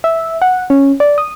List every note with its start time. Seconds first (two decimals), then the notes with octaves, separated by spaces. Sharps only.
0.04 E5
0.42 F#5
0.70 C#4
1.00 D5
1.18 D#6